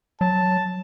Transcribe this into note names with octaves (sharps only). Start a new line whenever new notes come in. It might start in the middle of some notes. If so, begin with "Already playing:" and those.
F#3 A5